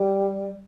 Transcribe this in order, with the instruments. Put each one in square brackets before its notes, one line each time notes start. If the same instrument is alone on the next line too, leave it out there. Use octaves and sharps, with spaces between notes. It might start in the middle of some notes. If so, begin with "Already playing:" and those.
Already playing: [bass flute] G3